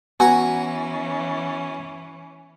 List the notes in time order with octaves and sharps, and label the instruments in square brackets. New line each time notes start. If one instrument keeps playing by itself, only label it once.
[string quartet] E3 C#4 [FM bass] B3 [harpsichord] F#4 F#5 A#5 [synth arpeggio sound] G#5